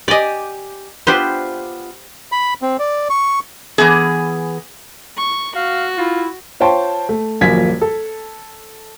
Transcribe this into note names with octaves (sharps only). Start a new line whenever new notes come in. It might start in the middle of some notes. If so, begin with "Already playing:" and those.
G4 D5 D#5 G#5
B3 D4 F4 G4 B4 C5
B5
C4
D5
C#6
E3 F3 B3 G#4
C#6
F#4 F5
E4 F4
F4 C5 C#5 G5 A5 C6
A3
D#1 A#1 F#2 A#3 G#6 B6
A4